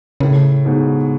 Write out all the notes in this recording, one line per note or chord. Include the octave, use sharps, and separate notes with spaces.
A2 C#3
G#2 B2